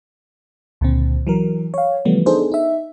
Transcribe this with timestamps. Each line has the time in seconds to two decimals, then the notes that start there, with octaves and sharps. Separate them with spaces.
0.81 C#2 A#2 D3 C4
1.27 E3 F#3 A#4
1.74 C#5 F5
2.05 C#3 E3 F3 G3 A3 B3
2.26 B3 D4 D#4 G#4 A4 C5
2.52 D#4 E5